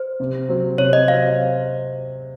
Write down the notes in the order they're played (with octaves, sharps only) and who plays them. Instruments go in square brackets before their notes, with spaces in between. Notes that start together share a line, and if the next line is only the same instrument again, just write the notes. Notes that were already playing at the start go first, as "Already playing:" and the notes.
Already playing: [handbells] C5
[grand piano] C3
F#3 C4
[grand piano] C3 [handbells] C#5
[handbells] D#5
[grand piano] F#3 C4 [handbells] F5